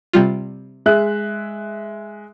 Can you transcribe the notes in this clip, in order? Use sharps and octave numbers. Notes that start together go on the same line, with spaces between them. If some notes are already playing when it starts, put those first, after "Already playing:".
C3 G3 F4
G#3 E5 F#6